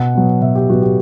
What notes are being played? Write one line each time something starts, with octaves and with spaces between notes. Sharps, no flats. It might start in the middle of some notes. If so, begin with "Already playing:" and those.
Already playing: B2 F#5
F#3 B3
B2 E5
G4
F#3 B3 F#4
G4